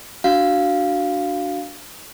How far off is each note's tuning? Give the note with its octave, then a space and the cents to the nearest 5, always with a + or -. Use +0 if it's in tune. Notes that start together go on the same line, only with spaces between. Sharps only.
D4 +0 F#4 +0 F5 +0